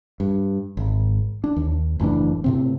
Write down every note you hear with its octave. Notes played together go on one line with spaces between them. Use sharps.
G2
G#1
D4
D#2
F#1 A2 E3 D4
A2 C3 C4